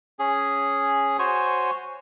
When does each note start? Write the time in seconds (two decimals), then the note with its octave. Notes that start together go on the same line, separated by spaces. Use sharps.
0.19 C#4 G#4
1.19 F#4 C5 C#5 G#5